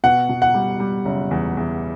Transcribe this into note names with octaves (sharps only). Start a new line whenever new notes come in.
B2 F#5
B2
F#5
G3
G3
F#1
E2
E2